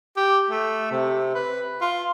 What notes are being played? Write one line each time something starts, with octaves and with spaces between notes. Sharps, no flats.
G4
A3
C3
B4
F4